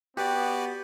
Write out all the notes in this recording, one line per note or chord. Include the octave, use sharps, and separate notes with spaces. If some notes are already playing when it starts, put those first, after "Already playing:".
B3 F#4 G4 B4 D5